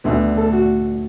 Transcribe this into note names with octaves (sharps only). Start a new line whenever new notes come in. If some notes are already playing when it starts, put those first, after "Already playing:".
D2 D3 B3
A4
F#4